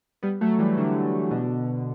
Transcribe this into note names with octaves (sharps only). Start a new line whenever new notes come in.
G3 B3
F#3 A3
E3 G3
D3 F#3
B2 D3